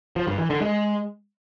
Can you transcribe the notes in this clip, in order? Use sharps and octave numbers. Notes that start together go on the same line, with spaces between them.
F3
G2
E3
D3
G#3